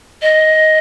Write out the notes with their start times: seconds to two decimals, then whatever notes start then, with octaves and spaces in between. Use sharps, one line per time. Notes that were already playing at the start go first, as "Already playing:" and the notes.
0.22 D#5